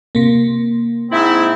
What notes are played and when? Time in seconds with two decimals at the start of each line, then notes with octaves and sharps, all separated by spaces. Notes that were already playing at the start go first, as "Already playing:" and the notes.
0.15 C3 A#3
1.11 G#2 C4 E4